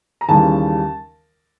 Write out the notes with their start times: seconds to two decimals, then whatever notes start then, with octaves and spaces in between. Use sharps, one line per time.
0.21 A#5
0.29 D#2 C#3 E3 G3 A5